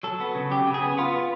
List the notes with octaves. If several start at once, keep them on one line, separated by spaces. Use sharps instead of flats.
F#3 A4
B3
C#3
F#3 G4
C#3
G#4
B3
B3 F4
B3